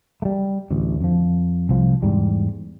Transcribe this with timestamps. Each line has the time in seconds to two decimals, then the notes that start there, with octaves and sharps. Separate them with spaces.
0.22 G3 A3
0.71 A1 D2
1.00 F2 F3
1.69 C2 F3
2.02 E2 G#2 G3